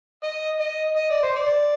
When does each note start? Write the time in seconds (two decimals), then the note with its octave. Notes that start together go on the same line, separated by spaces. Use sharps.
0.23 D#5
0.60 D#5
0.96 D#5
1.10 D5
1.23 C5
1.36 D5